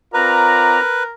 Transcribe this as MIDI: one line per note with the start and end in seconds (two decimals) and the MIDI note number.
0.14 0.78 60
0.14 0.78 65
0.14 1.13 70
0.14 1.03 71
0.14 0.78 74
0.14 0.81 82